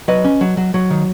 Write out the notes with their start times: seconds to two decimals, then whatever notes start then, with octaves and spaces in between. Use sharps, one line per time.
0.08 F#3 B4 D#5
0.24 C#4
0.41 F#3
0.57 F#3
0.74 F#3
0.90 D#3